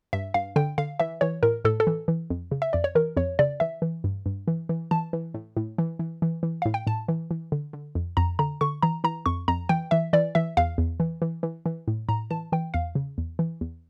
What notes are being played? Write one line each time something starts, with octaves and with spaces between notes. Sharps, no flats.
G2 E5
G2 F5
D3 G5
D3 F5
E3 E5
E3 C#5
A2 A#4
A2 A4
A4
E3
E3
F2
C#3
E5
F2 D5
C#5
E3 A#4
F2 C#5
C#3 D5
E3 E5
E3
G2
G2
E3
E3
E3 A5
E3
A2
A2
E3
E3
E3
E3
A2 F5
G5
A2 A5
E3
E3
D3
D3
F2
F2 A#5
D3 A#5
D3 C#6
E3 A#5
E3 A#5
F2 C#6
F2 A#5
E3 G5
E3 E5
E3 D5
E3 E5
E2 F5
E2
E3
E3
E3
E3
A2
A2 A#5
E3 A5
E3 G5
E2 F5
C#3
E2
E3
E2